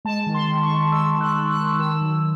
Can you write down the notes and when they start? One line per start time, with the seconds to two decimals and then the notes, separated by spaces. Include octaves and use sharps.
0.05 G#3 A5
0.27 D#3
0.34 C6
0.48 D#3
0.63 C#6
0.70 G#3
0.92 G#3 E6
1.14 D#3
1.21 F#6
1.36 G#3
1.50 F#6
1.57 D#3
1.79 D#3 E6
2.01 F#3